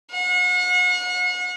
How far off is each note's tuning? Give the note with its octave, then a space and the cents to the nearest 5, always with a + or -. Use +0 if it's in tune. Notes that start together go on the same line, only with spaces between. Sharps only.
F#5 -40